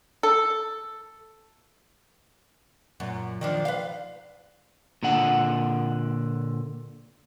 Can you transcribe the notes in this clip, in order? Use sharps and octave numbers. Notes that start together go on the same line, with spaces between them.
A4
F#2 A#2
D#3 F3 D4
B4 D5 F5
A#2 D3 F#5